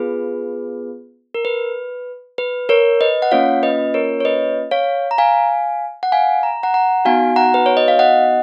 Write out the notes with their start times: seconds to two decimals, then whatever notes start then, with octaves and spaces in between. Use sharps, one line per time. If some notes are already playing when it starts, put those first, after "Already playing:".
Already playing: B3 F4 G#4 B4
1.34 A#4
1.45 B4
2.38 B4
2.69 A#4 C#5
3.01 B4 D#5
3.22 F#5
3.31 A#3 C#4 F4 C#5 F5
3.63 B4 D#5
3.94 A#4 C#5
4.20 C#5
4.25 B4 D#5
4.71 C#5 F5
5.11 A#5
5.18 F5 G#5
6.03 F#5
6.12 F5 G#5
6.43 A#5
6.63 F#5 A#5
6.74 F#5 A#5
7.05 B3 D#4 F#4 F5 G#5
7.36 F#5 A#5
7.54 B4
7.66 C#5
7.77 D#5
7.88 F5
7.99 D#5 F#5